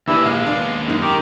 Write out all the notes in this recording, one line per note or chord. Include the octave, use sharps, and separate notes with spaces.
D#2 E3 G#3 D4 E4 G4 E6
A#1 F5 F6
B3 D4
F#2 D#4
D#3 G4 A#4